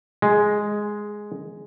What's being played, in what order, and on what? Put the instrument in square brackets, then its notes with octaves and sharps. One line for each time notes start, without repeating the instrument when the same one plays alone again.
[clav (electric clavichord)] G#3